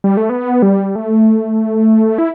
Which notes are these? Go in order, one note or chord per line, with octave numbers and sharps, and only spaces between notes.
G3
A3
B3
G3
A3
E4